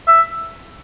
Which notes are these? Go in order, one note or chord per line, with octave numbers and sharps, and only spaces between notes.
E5